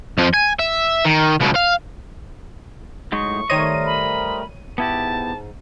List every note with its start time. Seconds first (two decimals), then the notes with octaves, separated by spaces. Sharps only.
0.18 F2 F3
0.34 G#5
0.59 E5
1.05 D#3
1.41 C#2 B2
1.56 F5
3.12 A2 F#3 G#3 D#4 C#6
3.50 D#3 G3 A3 A#4 C5 C#5 D#5 D#7
3.86 B5
4.78 G#2 B3 E4 G4 A5